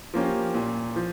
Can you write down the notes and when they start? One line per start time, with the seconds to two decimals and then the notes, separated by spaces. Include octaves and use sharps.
0.14 F3 A#3 C#4 G4
0.54 A#2
0.96 F3